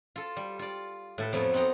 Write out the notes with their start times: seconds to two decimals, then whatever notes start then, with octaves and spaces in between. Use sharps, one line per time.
0.16 F4 A4
0.37 G3
0.59 F4 D5
1.18 A2 A4 B4
1.33 F2 F3 F#3 B3
1.53 B3 C4 D#4 F#5 G5 A#5